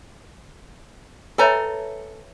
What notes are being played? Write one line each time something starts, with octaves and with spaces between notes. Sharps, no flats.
A4 B4 C#5 E5 G#5 A#5